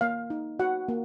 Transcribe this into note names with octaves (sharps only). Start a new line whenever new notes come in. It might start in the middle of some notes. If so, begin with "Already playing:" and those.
A#3 F5
D#4
F#4 F#5
A#3